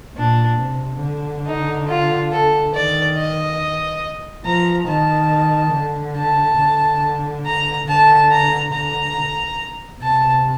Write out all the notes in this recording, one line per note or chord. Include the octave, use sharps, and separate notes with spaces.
A#2 D4
C3
D3
D#4
F4
A4
D#3 D5
D#5
F3 A#5
D#3 A5
D3
A5
D3
A#5
D3 A5
A#5
D3 A#5
C3 A5